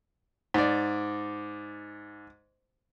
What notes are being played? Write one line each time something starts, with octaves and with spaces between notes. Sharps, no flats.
G#2 D5